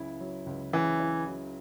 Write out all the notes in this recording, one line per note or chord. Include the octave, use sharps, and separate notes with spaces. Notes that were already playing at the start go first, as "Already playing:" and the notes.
Already playing: C#2 C#3 F#3 E4
F#3
C#2
C#3 E3
E4
F#3